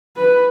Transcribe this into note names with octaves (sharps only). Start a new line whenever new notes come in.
B4